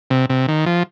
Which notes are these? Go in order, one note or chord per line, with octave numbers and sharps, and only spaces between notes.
C3
C3
D#3
F3